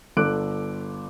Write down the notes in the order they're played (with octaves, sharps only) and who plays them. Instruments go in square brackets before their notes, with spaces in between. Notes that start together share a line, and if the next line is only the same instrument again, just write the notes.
[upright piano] G1 A4 D6 F#6 D7